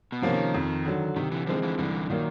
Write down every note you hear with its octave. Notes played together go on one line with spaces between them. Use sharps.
B2
C3 E3 F3 A#3 C#4
D#3
F2
D3 F#3
C3 D#3
D3 E3
D3 E3 F3 G#3 C4
D3 E3
C2 D3 E3
A#2 D#3 F#3 A#3